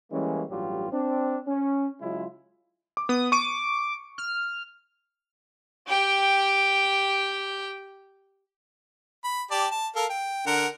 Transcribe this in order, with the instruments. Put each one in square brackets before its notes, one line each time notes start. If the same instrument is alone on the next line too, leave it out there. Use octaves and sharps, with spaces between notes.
[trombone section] E3 G3 G#3 A#3 C#4
A1 G2 F#3 G3 F4 G4
C4 D4
C#4
C#3 F#3 G#3 E4 F4
[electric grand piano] D6
[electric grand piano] B3 [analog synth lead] D#6
[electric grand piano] C#6 D#7 [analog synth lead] D6
[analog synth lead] F6
[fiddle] G4 G5
[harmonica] B5
G4 D5 A5
A5
A4 A#4 F5
G5
D3 A#4 F#5